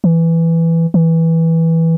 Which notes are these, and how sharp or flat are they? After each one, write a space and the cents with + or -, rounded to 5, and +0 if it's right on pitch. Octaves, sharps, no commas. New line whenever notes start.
E3 +5
E3 -10